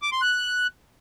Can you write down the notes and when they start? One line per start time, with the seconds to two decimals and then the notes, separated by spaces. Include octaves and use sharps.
0.02 D6
0.12 C6
0.22 F#6